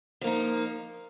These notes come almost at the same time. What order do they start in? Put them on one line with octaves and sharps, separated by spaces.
F3 A#3 D#4